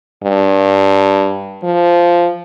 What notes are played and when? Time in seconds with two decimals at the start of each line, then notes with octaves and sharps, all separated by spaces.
0.24 G2
1.64 F3